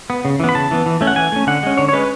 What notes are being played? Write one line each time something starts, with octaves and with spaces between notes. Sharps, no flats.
B3
C#3
E3 B3
B5
C#3 A5
E3 B3
E3
A3 C#4
F#5
E3 G#5
A3 C#4
D3 F#5
G#3 C#4
D3 C#5
C#5
G#3 C#4 B4